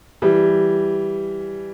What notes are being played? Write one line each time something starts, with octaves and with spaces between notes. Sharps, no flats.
E3 G3